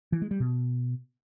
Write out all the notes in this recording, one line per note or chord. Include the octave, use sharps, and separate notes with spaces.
E3
G#3
G3
B2